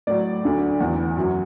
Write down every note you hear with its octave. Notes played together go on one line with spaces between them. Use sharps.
A2 F#3 D5
D2 D3 F#3
E2 E3 F#5
F#2 F#3